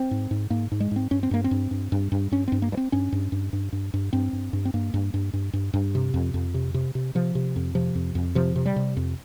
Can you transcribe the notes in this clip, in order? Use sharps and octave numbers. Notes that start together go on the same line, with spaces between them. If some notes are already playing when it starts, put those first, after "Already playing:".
Already playing: C4
G#2
G#2
G#2 A#3
G#2
G#3
G#2 C4
G2 C#4
C4
G2 A#3
C4
G2
G2
G2
G2
G2 C#4
G2 C4
A#3
G2
C4
G2 C#4
G2
G2
G2
G2
G2
G2 C4
G2
G2
C4
G2 A#3
G2
G2
G2
G2
G2
C3
F2
F2
C3
C3
C3
C3 F3
C3
F2
C3 F3
F2
F2
C3 F3
C3
G3
C3
F2